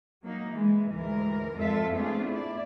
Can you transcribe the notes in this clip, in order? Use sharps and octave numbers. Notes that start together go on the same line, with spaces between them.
F#3 A#3 D#4
E3 G#3
D2 G#2 E3 A#4
F2 G#3 F4 A4 E5
A3 B3 C4 D4 F4 G#4
E4 D5